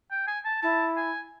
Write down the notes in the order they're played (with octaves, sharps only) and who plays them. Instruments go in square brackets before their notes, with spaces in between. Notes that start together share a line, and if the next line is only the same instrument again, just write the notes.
[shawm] G5
G#5
A5
[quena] E4 [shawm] A5
[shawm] G#5